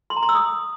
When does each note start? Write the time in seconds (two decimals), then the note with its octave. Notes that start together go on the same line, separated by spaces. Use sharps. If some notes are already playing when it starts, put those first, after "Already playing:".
0.10 C6
0.16 A#5
0.23 C6
0.29 E6
0.35 D#6